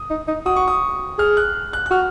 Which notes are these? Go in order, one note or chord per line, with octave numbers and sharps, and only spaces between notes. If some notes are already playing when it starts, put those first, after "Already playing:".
Already playing: D#6
D#4
D#4
F#4 D#6
C#6
D#6
G#4 F6
F#6
F#6
F#6
F#4 F6